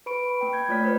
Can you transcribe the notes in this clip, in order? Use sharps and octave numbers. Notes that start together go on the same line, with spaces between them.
B4 B5 C#6 D7
B5
A#3 G5
B5 G6 G#6
A3 F4 C#5 D5 F6 B6
A#3 B4 C5